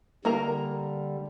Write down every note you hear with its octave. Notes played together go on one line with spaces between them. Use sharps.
D3 G3 A#3 A#4 A#5